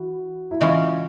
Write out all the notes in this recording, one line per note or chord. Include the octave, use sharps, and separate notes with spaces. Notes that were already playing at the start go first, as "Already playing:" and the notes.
Already playing: E3 F#4
E4
C#3 E3 G#3 C#4 F4